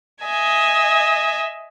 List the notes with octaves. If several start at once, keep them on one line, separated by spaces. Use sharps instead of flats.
D#5 E5 G#5